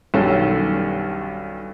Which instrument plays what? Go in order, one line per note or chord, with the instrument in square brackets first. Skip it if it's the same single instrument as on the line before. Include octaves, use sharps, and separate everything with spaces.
[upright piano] B1 G2 D#3 C#4 A4